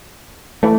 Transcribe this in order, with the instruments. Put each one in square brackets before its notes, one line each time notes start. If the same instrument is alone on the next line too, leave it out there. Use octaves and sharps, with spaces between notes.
[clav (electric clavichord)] E3 [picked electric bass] A3